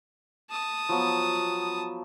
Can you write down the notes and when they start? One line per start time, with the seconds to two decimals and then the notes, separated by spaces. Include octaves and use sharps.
0.50 A5 D#6
0.89 F3 F#3 B3